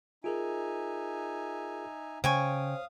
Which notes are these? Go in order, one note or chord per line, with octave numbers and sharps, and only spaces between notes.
D#4 F4 G#4 A#4 E5 G#5
C#3 C5 C#5 F5 G5 G#5 C#6 D#6